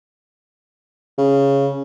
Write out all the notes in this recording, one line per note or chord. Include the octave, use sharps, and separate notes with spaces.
C#3